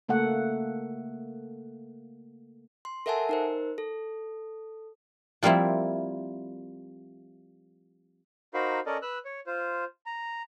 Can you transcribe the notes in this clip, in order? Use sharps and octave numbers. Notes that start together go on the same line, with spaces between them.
C#3 A3 A#3 A4 F#5
C6
A4 A#4 E5 F#5 G#5 A5
D#4 A#4 C5
A4
F3 G3 A#3 C4 E4
D#4 F#4 A#4 C5 F5 B5
C#4 A4 A#4 D5 D#5
B4 E6 F#6
C#5
F4 C5
A#5